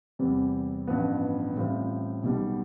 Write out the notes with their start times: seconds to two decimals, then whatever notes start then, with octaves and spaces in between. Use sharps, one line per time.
0.19 E2 C3 G3 C4
0.87 A1 G2 F3 B3
1.55 A1 A2 G3 C4 F4
2.23 B1 B2 G3